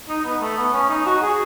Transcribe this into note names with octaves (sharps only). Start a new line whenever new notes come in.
D#4
B3
A3
B3
C#4
D#4
F#4
G#4